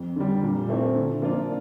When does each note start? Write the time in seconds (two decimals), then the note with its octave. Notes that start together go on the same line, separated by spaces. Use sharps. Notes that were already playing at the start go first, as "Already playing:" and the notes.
Already playing: F2
0.16 D3 G3
0.43 A#2
0.69 A3 C4 E4
0.95 D3
1.22 F3 A#3 D4 F4